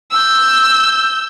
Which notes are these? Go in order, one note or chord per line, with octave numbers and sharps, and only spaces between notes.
E6 G6